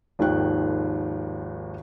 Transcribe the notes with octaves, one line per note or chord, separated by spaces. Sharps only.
G#1 D#2 D#3 F3 G5 F#6